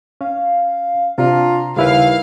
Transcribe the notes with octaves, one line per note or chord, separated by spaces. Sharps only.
C#4 F5
C3 D4 F4 A#5
D#2 C#3 G3 E4 B4 F5